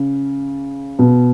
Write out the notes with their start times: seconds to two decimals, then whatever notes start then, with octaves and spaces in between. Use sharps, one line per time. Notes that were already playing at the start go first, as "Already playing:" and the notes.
Already playing: C#3
0.99 B2